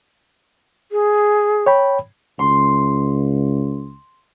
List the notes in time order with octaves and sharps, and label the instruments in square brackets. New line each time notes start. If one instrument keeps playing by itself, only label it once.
[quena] G#4
[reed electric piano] C#5 G5 B5
[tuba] C#2 [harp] C6